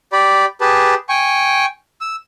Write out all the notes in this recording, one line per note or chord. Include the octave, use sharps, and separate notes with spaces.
G4 D5 B5
G4 G#4 B4 A5
G5 G#5 C#6
E6